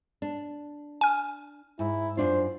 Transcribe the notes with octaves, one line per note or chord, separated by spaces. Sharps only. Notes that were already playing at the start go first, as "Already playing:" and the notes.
D4
G#5 F6
G#2 E4
F#2 D4 F4 C5